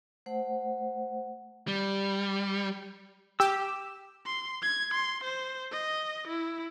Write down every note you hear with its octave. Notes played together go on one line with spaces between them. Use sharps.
A3 C5 F#5
G3
G4 E6
C6
G#6
C6
C5
D#5
E4